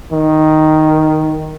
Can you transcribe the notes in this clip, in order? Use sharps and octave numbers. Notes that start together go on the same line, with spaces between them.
D#3